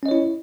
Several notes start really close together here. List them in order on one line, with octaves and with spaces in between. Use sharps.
C#4 D#5 C#5 E4